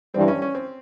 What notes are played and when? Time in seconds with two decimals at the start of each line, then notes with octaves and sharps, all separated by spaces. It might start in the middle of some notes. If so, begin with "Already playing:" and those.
0.14 G2 E3 G3 C4
0.28 C#4
0.42 C#4
0.55 C4